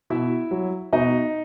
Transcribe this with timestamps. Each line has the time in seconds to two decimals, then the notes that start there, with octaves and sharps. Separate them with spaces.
0.10 B2 E4 E5
0.51 F#3
0.93 B2 D#4 D#5